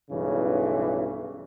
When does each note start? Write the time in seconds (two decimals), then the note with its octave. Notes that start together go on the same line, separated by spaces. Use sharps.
0.11 B1 G2 C#3 E3